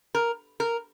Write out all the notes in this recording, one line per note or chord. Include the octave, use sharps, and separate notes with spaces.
A#4
A#4